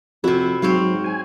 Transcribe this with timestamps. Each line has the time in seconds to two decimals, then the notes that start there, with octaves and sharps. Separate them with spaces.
0.24 F2 C3 E4 F#4
0.62 G#2 F#3 C4 C#5 F5
1.04 G#5